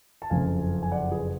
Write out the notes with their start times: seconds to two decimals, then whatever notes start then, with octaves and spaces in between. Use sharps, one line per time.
0.22 A5
0.30 F#1 F2 C#3 F5 G#5
0.82 G#5
0.91 D5 F#5
1.11 G#4 B4